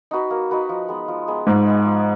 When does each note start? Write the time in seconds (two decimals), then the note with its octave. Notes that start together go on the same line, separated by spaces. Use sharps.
0.11 D#4 F#4 B4
0.31 A#3
0.51 D#4 F#4 B4
0.69 F3
0.88 G#3 B3
1.08 F3
1.28 G#3 B3
1.47 G#2 F3
1.66 G#3 B3
1.85 F3